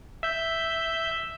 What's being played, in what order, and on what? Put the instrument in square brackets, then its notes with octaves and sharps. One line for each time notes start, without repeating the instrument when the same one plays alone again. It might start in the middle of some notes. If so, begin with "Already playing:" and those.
[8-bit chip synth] E5 G6